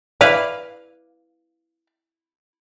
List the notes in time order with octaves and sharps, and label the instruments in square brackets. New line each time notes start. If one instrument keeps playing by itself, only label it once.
[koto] E4 B4 F5 [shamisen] D5